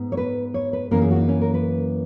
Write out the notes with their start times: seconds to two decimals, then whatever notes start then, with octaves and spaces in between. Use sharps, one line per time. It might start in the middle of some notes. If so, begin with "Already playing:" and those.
Already playing: G#2 B3
0.12 C#5
0.17 B4
0.54 C#5
0.73 B4
0.91 F#2 E3 A#3 C#4 A#4
1.02 G#4
1.11 F#4
1.16 C#4
1.20 D#4
1.29 C#4
1.41 A#4
1.54 B4